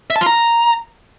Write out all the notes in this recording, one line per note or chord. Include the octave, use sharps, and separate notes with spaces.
E5
A5
F4
A#5